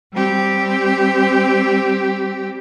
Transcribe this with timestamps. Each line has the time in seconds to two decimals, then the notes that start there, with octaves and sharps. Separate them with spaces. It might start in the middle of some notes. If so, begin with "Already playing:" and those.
0.14 G3 C4 G4